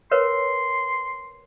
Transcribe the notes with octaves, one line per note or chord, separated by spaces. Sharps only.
A#4 B4 C#5 C6